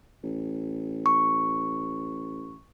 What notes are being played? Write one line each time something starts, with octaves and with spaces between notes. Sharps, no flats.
A1
C#6